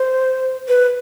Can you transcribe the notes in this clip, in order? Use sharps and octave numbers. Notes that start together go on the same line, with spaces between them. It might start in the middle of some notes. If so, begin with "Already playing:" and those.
Already playing: C5
B4